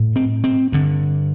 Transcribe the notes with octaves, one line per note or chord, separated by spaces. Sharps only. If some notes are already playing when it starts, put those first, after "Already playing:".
Already playing: A2
C4
C4
G2 D3